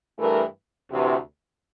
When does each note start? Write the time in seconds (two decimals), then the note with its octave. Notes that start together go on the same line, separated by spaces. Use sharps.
0.18 G2 E3 A3 E4 A#4
0.91 D2 C3 E3